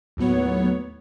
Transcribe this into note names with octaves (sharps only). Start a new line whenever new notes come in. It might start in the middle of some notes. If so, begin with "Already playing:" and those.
D#2 A2 F#3 B3 C#5